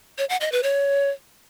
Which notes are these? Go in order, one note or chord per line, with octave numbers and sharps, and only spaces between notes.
C#5
F#5
D#5
B4
C#5